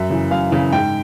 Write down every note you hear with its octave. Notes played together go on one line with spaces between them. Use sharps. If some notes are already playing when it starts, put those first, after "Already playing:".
Already playing: F#2 E5
C#3 E3
F#2 F5
C#3 E3
G#2 G5